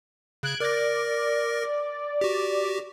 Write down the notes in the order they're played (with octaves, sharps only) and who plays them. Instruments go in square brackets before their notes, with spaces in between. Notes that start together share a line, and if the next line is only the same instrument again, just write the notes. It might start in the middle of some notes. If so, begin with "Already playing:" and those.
[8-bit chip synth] C#3 [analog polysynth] F#6 G#6 D7
[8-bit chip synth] A#4 A#6 [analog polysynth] D5
[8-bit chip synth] F#4 G4